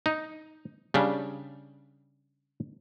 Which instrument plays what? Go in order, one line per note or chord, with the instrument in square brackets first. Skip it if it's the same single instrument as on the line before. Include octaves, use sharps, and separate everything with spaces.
[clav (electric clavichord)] D#4
C#3 G3 D4